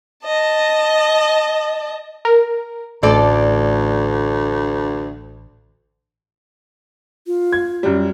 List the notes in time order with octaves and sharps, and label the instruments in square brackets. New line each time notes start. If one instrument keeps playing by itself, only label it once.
[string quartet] D#5 A5
[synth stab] A#4
[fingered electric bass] A1 A2 [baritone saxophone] D2 [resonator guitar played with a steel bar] A4 D5
[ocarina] F4
[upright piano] G#6
F#2 G3